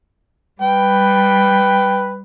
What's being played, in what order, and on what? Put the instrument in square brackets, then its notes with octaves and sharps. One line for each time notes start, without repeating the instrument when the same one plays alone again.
[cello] G3 [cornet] B4 [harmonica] G5